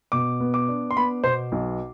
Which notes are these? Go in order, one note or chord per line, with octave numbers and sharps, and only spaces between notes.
B2 D6
B3
D6
D4
C6
B3 B5
B2 C5
B1